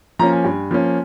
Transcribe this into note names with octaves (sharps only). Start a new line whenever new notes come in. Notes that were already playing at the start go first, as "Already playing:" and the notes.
F3 A#3 C#4 A#5
G#5
G2
F3 A#3 C#4